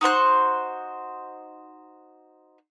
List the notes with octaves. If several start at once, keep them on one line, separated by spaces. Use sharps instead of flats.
D#4 F#4 C5 F#6